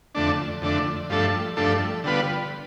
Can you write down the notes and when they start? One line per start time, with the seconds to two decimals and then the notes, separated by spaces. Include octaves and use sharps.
0.15 F2 D3 A3 D4
0.62 F2 D3 A3 D4
1.10 G2 F3 A3 D4 A4
1.57 G2 F3 A3 D4 A4
2.04 D3 G3 B3 F4 B4